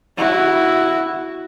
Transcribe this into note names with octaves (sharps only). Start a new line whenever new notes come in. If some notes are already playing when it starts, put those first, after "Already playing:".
E4 F#4